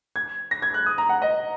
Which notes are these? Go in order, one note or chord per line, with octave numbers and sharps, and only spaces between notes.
G#6
A#6
G#6
F#6
D#6
A#5
F#5
D#5